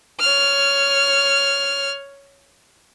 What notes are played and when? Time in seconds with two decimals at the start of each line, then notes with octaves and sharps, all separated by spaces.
0.20 C#5 F6